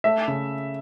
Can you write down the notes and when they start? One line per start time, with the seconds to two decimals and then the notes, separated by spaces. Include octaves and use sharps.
0.04 A3 E5
0.28 C#3